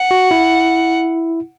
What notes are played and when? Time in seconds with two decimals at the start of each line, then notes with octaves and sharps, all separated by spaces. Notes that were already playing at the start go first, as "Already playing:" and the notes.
Already playing: F#5
0.11 F#4
0.31 E4